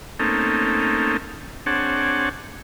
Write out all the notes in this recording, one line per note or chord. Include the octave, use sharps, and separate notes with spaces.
A3 A#3 C4 C#4 D#4 A4
C4 D4 G#4 C#5 F#5 A5